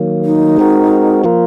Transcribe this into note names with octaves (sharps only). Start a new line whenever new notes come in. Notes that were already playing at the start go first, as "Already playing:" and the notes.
Already playing: D#3 F#3 A#3
D#4
G#3 C4 F#4 A#4
F3 A#3 F4 A#4